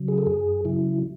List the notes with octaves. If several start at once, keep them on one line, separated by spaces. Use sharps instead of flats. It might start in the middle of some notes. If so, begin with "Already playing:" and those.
Already playing: C#3 F#3
G#4
A4
F#2 G#4
C#3 F#3 E4